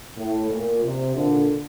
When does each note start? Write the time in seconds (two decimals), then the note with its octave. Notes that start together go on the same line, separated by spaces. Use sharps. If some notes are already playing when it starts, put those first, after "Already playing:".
0.17 A2
0.50 A#2
0.83 C3
1.15 A#2 D3